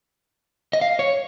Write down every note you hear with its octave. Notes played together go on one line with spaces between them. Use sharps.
D#5
F5
C#5